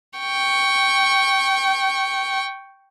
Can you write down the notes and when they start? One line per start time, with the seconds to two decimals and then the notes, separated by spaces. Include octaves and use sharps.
0.20 G5 C#6